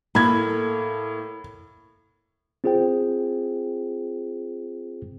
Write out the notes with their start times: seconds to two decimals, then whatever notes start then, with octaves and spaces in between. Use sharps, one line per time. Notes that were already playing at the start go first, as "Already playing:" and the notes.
0.15 A2 A#3 A4 B5 G#6
2.64 C4 F4 G#4 C5 G5